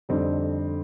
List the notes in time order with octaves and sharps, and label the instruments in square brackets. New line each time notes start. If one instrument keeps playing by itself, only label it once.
[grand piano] F2 D3 G3 C4 D#4